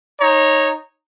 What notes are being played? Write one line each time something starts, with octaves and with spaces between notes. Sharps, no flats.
D#4 C#5 A#5